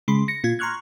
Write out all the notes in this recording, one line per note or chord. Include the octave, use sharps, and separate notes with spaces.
C#3 G#3 B5 C6
A#6 C#7
A#2 F4 G#6
A#5 C6 C#6 F6 F#6 G#6